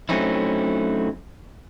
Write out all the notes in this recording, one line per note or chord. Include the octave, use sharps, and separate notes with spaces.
F#3 A3 C4 C#4 D#4 E4